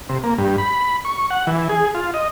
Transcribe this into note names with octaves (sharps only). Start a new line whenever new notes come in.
C3
A#3
G2
B5
C#6
F#5
E3
G#4
F4
D#5